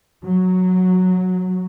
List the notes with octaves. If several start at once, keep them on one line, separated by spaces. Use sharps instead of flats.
F#3